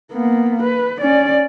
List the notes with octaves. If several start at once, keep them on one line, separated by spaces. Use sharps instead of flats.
A#3 B3
B4
C#4 D5